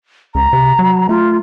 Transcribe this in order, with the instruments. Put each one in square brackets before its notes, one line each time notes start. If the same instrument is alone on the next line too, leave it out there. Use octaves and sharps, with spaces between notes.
[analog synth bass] C#2 [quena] A#5
[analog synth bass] C3
F#3
[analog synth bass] A3 [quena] F4